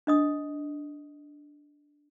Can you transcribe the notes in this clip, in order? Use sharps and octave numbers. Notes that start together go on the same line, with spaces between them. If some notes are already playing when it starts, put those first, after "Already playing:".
D4 D#5 D#6